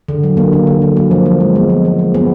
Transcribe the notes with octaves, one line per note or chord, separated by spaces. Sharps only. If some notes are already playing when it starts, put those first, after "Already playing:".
D3
F#3
A#3
D3
D3
F#3
A#3
F3
F3
G#3
B3
F3
F3
G#3
B3